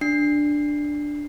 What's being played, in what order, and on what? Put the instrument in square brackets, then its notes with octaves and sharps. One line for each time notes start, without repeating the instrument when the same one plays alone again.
[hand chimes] D4 C7